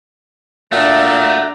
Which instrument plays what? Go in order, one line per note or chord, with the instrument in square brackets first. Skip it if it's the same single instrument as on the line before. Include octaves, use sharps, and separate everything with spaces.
[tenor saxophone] A#2 [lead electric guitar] A3 [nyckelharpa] D4 A#5 [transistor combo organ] F#4 E5 F#5